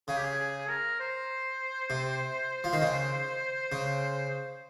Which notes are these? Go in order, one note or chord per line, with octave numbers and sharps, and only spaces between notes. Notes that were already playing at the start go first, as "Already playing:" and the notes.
C#3 G#4
G4
G#4
G#4
A#4
C5
C3
F3
D#3
C#3
C#3